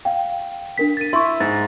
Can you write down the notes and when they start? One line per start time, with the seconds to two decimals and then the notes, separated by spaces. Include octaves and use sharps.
0.05 F5 G5
0.78 D4 A#4 B6
0.97 A6 D#7
1.13 E4 C6 C#6
1.40 G#2 A6